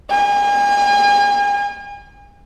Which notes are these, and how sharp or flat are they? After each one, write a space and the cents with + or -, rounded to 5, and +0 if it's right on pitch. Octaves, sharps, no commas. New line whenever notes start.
G#5 -40